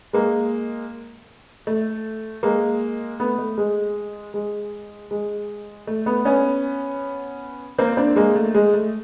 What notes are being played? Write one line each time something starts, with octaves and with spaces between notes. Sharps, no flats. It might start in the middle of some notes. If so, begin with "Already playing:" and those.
G#3 A#3
A3
G#3 A#3
A3 B3
A3
G#3
G#3
G#3
A3
A3 B3
B3 C#4
A#3 C4
C4 D4
G#3 A#3
A3
G#3
A3